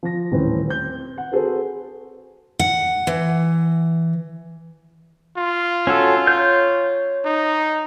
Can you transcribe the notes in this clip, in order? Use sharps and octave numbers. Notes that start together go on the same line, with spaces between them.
F3 A#6
D#1 A2 E3 C4 C#4 B4
C4 G6
F#5
C4 F#4 G#4 A4 B4 C5
F#5
E3
F4
C#4 F#4 A4
C#5 G6
D#4